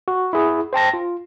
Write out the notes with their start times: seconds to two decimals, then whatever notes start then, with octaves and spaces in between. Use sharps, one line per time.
0.08 F#4
0.33 E4 G#4
0.73 C5 G5 A5 A#6
0.94 F4